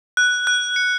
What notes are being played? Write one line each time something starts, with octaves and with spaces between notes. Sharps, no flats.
F#6
F#6
C#7